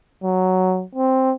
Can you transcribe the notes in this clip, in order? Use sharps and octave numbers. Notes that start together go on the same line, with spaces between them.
F#3
C4